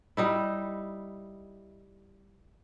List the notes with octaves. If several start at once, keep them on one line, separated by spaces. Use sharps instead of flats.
G3 D#4 E4